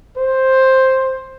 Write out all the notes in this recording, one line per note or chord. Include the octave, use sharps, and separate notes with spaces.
C5